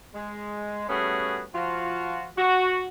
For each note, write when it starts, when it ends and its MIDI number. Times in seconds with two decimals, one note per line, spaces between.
0.15 0.87 56
0.89 1.44 55
0.89 1.44 57
0.89 1.44 59
0.89 1.44 61
0.89 1.44 66
0.89 1.44 68
1.55 2.28 53
1.55 2.28 65
1.55 2.28 66
2.38 2.88 66